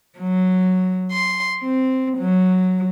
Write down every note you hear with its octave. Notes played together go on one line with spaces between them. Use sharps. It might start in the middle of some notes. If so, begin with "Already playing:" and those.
F#3
C6
C4
F#3